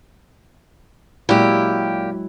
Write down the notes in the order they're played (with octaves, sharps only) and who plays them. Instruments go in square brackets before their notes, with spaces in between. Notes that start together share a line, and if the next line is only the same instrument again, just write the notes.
[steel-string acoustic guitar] A#2 G4 [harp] F#3 G#3 F#4 [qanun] E4 G5